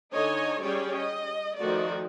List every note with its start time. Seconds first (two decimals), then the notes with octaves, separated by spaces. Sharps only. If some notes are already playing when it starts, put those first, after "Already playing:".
0.13 D3 D#4 C#5 D#5 G#5
0.62 G3 C#4 G#4 C#5 D5 G5
0.97 D#5
1.59 D#3 F3 A3 D#4 F#4 D5